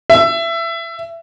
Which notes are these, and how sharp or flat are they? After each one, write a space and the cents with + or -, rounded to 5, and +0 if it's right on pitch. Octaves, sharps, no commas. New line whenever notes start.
E5 +20